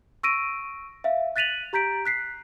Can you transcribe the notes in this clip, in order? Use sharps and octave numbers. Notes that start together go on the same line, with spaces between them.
C#6 E6 A#6 D7 D#7
E5 F5
F#6 A6 B6 D#7 F7 F#7
G4 A#5 G6 B6 D7
F#6 B6 C7